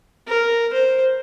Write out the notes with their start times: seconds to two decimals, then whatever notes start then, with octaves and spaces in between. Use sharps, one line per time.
0.27 A#4
0.73 C5